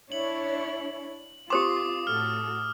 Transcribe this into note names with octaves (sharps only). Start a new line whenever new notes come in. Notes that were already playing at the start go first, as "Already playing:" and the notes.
D4 E4 C#5 F#7
C4 F4 G4 C5 C6 D6 D#6
A2 F#4 A4 F6